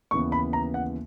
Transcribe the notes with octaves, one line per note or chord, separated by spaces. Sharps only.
D#2 C#3 E3 B3 C#6
B5
A#5
F#5